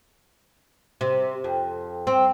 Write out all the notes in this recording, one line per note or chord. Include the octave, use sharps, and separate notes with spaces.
C3
F2
C4